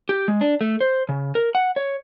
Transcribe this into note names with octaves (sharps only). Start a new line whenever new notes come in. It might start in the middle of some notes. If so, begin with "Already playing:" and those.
G4
G#3
D4
A3
C5
C#3
A#4
F#5
C#5